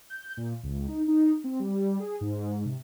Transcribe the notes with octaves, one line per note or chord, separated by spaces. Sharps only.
G6
A#2
C#2
D#4
D#4
C4
G3
G#4
G#2
C3